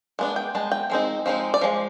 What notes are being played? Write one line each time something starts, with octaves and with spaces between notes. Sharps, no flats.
G#3 B3 D4
G5
G#3 B3 A5
G5
F3 G#3 C4 D#4
F3 G#3 C4 D#4
D5
F3 G#3